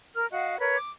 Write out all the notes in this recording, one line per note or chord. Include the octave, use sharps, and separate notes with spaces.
A#4 F6
F#4 D#5 F5 F#5
A#4 B4 C#5
D6